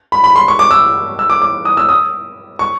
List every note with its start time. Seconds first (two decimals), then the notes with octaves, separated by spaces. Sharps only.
0.12 B5
0.24 B5
0.36 C6
0.48 C#6
0.59 D6
0.71 E6
1.19 E6
1.30 D6
1.42 D6
1.65 D#6
1.77 E6
1.89 D#6
2.59 C#6